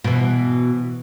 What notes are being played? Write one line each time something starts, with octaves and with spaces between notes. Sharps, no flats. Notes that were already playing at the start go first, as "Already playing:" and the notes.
B2 E3